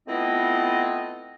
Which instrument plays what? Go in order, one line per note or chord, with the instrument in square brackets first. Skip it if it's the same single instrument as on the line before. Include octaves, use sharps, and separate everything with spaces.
[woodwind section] A3 B3 C4 E4 F4 D#5